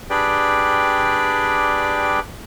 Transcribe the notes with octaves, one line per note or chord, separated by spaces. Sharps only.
D4 G4 G#4 B4 D5 G5